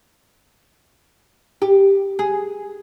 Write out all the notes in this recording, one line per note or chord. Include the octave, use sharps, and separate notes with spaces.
G4
G#4